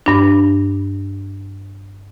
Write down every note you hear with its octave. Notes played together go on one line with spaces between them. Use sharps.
G2 D4